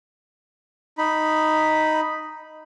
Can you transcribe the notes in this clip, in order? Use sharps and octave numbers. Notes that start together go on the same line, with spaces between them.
D#4 B5